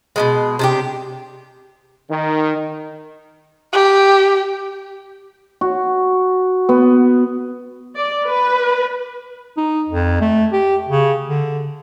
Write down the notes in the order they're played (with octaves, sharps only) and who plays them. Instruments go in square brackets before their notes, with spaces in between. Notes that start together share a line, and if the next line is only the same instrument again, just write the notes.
[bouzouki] B2 D#3 G#3
C3 D4 G4
[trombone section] D#3
[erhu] G4
[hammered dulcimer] F#4
B3
[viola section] D5
B4
[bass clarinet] D#4
F2
A3
G4
C#3
D3